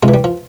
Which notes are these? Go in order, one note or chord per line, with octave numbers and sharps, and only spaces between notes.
C3 F3 G#3
E3
G3
F3